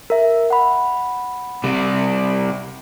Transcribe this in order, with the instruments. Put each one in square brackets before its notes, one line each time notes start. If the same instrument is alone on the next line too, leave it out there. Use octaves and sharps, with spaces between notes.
[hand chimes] A#4 E5
F#5 B5
[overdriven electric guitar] C3 G3